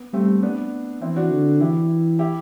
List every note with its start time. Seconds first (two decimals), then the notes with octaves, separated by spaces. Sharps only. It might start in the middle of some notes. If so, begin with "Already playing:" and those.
Already playing: B3
0.13 G3 A3 C4
0.43 B3 D4
1.01 E3 C4 E4
1.16 D4 F#4
1.31 D3
1.60 E3 E4 G4
2.19 E4 G4